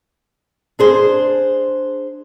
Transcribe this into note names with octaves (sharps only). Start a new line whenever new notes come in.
D4 G#4 C5